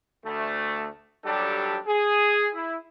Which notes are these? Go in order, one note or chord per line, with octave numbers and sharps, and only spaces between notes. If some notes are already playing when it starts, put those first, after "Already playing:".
D2 A3
D#2 F#3 G3 D4 G4 A4
G#4
E4